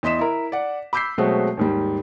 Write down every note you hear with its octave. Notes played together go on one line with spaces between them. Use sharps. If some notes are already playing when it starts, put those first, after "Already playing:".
E2 D#5 C6 B6 E7
E4 A#4
D5 F#5
B5 D6 E6 G6 B6 C7
B2 F#3 G#3 A3 C4 F#4
D#2 G#2 G3